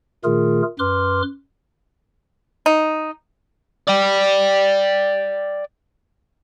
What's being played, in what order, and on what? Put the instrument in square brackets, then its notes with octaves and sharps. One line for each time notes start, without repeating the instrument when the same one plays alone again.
[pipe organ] A#2 D#3 A3 F4 G#4 A#4
F#2 B4 C6 D6 F6
[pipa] D#4
[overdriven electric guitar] D5 G5